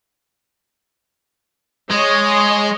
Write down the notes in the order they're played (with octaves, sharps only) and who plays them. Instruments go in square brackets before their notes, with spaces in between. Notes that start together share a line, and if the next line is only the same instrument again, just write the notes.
[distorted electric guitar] G#3 [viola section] C#5 D#5